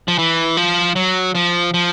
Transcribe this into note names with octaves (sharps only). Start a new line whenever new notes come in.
F3
E3
F3
F#3
F3
F3